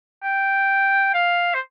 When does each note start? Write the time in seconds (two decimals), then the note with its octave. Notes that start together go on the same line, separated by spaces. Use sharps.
0.23 G5
1.14 F5
1.54 C5